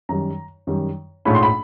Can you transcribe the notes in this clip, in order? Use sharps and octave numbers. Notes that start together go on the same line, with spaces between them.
F#2 D#3 G3 A#5
F#2 D#3 G3
A#1 G#2 F3 A3 C#4 B5
C6
B5